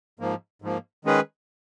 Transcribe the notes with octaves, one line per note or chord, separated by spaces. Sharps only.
G#2 F3 A#3
G#2 F3 A#3
D#3 G#3 C#4 G#4 B4